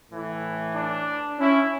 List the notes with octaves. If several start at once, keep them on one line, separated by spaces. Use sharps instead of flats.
A2 E3
D4
C#4 E4